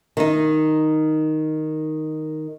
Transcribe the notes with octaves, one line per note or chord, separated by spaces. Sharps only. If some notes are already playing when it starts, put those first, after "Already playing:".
D#3 D#4